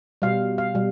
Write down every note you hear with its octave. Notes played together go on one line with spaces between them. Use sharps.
B2 G3 F5
F5
B2 G3